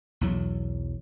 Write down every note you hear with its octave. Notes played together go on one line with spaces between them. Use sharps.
B1 E2 F#3